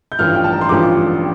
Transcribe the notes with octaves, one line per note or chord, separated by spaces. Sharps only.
G6
A1 G2 F3 F6
G5
A5
A#5
C6
A1 G2 F3 D6